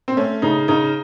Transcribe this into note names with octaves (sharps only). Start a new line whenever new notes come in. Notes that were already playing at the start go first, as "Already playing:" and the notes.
C4
A3 C#4
C#3 D#4
C#3 D#4